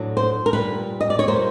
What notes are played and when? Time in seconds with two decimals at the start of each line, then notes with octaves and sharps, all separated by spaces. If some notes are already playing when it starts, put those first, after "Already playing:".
Already playing: A2 F#3 B3 D4
0.17 C5
0.46 A#4
0.53 A#2 G3 A#3 B4
1.01 D#5
1.10 D5
1.19 C#5
1.28 A#2 G3 A#3 C5